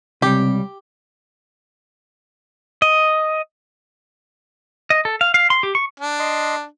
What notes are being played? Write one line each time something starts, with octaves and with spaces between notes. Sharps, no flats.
C#2 C3 G3 G4
D#5
D#5
A4
F5
F5
C6
G4
C#6
D4
D#5 C6